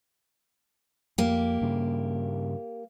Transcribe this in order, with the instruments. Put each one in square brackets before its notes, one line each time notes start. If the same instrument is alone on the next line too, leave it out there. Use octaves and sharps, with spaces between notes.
[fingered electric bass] F2 [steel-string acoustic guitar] A#3 G4
[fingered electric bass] G2 C#3